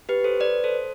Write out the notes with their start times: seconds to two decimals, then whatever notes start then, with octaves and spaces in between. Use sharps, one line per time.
0.09 G4 B4
0.24 A4 C5
0.40 B4 D5
0.64 A4 C5